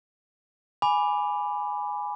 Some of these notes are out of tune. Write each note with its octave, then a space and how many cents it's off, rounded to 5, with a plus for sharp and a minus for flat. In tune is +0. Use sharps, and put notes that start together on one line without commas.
G#5 +0 B5 +0 D6 +0